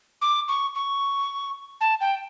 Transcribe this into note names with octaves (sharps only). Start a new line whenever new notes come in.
D6
C#6
C#6
A5
G5